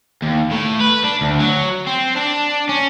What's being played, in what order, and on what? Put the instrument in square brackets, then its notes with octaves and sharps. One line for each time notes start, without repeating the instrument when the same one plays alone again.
[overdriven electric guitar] D#2
A2
B4
D4
D2
F#3
C4
D4
C#4